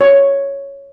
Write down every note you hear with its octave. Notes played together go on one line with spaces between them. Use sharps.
C#5